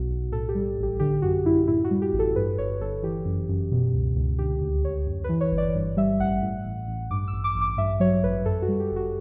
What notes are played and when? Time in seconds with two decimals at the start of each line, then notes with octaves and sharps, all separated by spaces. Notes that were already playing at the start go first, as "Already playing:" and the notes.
Already playing: B1 B2 F#4
0.10 B1
0.32 A2 A4
0.49 G4
0.55 G3
0.78 A1 G4
0.99 D3 G4
1.22 F#2 F#4
1.46 F#2 E4
1.68 A2 E4
1.84 F#4
1.91 G3
2.02 G4
2.13 A1
2.19 A4
2.36 G2 B4
2.58 G1 C#5
2.80 G1 A4
3.03 E3 G4
3.25 F#2
3.49 F#2
3.72 B2
3.94 C#2
4.16 C#2
4.39 D3 G4
4.61 D2
4.84 D2 C#5
5.06 F#2
5.24 E3 B4
5.41 C#5
5.52 G1
5.58 D5
5.75 G2
5.97 G3 E5
6.20 A1 F#5
6.42 A2
6.64 A1
6.88 A1
7.11 G2 D6
7.28 A1 E6
7.44 D6
7.55 A1
7.61 D6
7.78 G2 E5
8.00 F#3 C#5
8.24 A1 B4
8.46 F#2 A4
8.62 F#4
8.68 G3
8.80 G4
8.91 G1
8.96 F#4